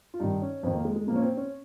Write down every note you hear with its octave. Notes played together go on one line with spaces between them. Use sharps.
F4
G2 D#3 D#4
C#4
F2 D#3 C4
A#3
G#3
G#3
A#2 F3 A#3
C#4
C4
C#4